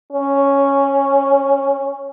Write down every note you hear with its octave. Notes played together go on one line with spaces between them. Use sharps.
C#4